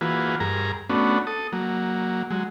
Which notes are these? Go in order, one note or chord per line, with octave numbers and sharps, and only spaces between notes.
E3 A#3 F4 F#4 G#4 B4
G2 G#4 A#4 A#5
A3 B3 C#4 D4 F#4
A4 D#6
F#3 A#3
F#3 G#3